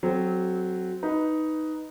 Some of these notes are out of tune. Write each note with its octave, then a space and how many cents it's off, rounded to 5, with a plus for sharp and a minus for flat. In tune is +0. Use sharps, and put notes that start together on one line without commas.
F#3 +0 C4 -5 A4 -35
D#4 +5 B4 +0